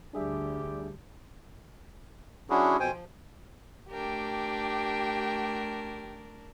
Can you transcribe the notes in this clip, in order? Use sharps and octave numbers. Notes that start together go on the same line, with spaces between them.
D2 D3 G3 D4 G4 G#4 E5
F#3 C#4 D4 E4 F#4 G#4
F2 B2 C5 G5 G#5
F3
A3 D4 G4 A#4 G5